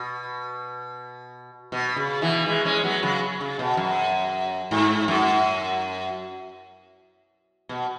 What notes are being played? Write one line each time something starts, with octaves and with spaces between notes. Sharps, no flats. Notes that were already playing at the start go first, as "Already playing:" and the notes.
Already playing: B2
B2
C#3
B2 E3
E3 G#3
G#3 C#4
F#3 B3
C#3 F#3
C#3
B2
F#2
G#2
F#2
B2